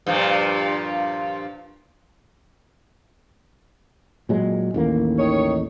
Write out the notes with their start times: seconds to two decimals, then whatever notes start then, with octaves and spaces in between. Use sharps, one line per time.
0.07 G2 A#2 F3
4.29 A#2 F#3 G#3
4.74 A1 D#2 A#3
5.17 D#3 D#4 C#5